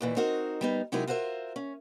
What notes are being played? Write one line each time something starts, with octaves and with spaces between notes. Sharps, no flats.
D#2 A#2 E3
C4 D#4 F#4 A#4
G3 B3 D#4
C3 F#3 G#3 D#4 E4 A#4
F4 F#4 A#4 C5 E5
C#4